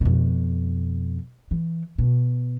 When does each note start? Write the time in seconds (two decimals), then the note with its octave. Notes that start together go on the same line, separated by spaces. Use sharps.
0.01 F2 B2
1.51 E3
1.98 B2